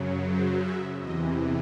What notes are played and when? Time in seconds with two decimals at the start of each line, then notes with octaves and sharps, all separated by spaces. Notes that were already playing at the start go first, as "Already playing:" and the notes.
Already playing: F#2 C#3 F#3
0.27 C5
0.63 E5
0.99 E2 C3 E3 D#5